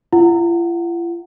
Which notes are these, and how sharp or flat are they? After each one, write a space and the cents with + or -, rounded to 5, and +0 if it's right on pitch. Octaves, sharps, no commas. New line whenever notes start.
F4 -45 F#5 +0